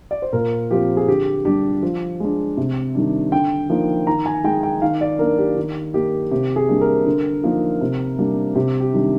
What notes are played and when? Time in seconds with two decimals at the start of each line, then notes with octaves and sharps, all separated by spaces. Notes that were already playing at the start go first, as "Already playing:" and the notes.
0.11 D5
0.22 C5
0.33 A#2 A#4
0.71 F3 C4 G4
0.97 G#4
1.08 D3 G4
1.45 G3 D4 G4
1.83 F3
2.20 G#3 D4
2.57 C3
2.95 D#3 G3 D4
3.32 D3 G5
3.70 F3 A#3 D#4
4.07 D#3 A#5
4.26 G#5
4.44 G#3 D#4 G5
4.63 G5
4.82 D#3 F5
5.01 D5
5.19 A#3 D4 A#4
5.38 G4
5.56 D#3
5.94 A#3 D#4 G4
6.31 C3 G4
6.56 G#4
6.69 G3 A#3 D4
6.81 A#4
7.06 D3
7.43 F3 A#3 D#4
7.81 C3
8.18 G3 A#3 D4
8.55 C3 G4
8.80 G4
8.93 D#3 G3 D4